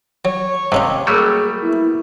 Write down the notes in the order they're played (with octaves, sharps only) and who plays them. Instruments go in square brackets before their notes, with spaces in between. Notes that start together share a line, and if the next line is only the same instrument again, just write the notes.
[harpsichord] F#3 [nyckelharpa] C#5
[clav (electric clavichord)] D#2 C3 [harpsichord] G#2 C#4 D#4
[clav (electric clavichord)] F#3 G3 A3 [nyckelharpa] A#3 A#4 [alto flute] G#4
[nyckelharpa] B3 [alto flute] E4